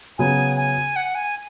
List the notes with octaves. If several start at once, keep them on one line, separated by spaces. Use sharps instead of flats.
C#3 F#3 B3 G#5
G#5
F#5
G#5